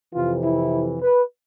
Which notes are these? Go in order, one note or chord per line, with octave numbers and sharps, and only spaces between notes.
F2 C3 E3 F4
E4
B4